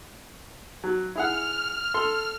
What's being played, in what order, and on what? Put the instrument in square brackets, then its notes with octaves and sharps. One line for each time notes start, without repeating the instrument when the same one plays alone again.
[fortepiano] F#3
[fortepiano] E4 G#4 F#5 [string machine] F6
[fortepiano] A4 C6